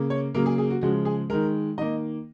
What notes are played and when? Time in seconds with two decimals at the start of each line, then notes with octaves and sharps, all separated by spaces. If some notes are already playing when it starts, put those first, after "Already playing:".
Already playing: C#3 A#3
0.10 C#5
0.34 C#3 F#3 A#3 A#4
0.46 G#4
0.58 G#4
0.70 F#4
0.81 C#3 F3 G#3 F#4
1.05 G#4
1.30 D#3 G#3 A#4
1.78 D#3 A#3 D#5